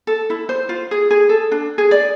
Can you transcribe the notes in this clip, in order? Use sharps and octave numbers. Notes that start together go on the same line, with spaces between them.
A4
E4
C5
F4
G#4
G#4
A4
D4
G#4
D5